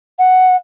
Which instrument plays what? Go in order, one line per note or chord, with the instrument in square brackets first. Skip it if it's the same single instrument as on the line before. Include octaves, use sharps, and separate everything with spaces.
[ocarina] F#5